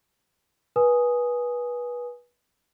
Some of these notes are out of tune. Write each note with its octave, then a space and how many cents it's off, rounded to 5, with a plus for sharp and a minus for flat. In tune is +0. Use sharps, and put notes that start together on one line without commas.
B4 -25 G#5 +0 D#6 +0